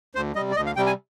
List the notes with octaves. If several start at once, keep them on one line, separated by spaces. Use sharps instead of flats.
D2 C5
C3 G3 D#5
D5
D2 D#5
F5
C3 G3 G5
G#5